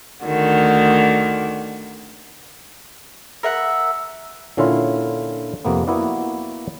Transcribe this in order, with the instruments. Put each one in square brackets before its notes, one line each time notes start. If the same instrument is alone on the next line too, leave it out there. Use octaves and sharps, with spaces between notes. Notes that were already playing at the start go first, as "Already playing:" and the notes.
[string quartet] D2 D3 D#3 F#4
[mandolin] A#4 E5 F#5
[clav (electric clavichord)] A#2 D3 C#4 E4 F4
F2 C3 A#3 B3
A#3 B3 E4 F#4 D5